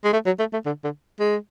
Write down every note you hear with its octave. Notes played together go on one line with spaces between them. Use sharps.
G#3
A3
F#3
A3
A3
D3
D3
G#3